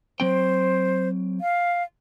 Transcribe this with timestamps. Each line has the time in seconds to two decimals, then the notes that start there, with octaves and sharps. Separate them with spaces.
0.20 F#3 C4 C5 G5
1.41 F5